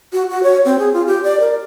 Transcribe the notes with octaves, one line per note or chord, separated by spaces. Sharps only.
F#4
F#4
C#5
C4
G#4
F4
G4
D5
A#4